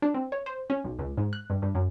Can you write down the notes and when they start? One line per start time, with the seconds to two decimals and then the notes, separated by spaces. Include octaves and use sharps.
0.02 D4
0.14 C4
0.32 C#5
0.46 C5
0.70 C#4
0.84 B1
0.99 C#2
1.17 G#2
1.33 F#6
1.50 G2
1.62 G2
1.75 F#2